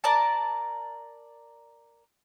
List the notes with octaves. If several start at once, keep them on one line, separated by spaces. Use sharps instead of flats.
A#4 D5 A5